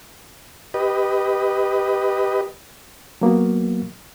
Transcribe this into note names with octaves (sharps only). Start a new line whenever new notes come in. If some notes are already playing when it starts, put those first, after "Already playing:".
G4 B4 D#5
F#3 A#3 B3 F#4